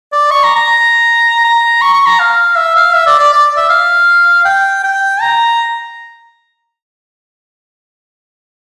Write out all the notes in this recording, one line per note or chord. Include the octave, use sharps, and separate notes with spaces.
D5
C#6
A#5
A#5
A#5
C#6
C#6
A#5
F5
E5
F5
E5
D5
D5
D5
E5
F5
G5
G5
A#5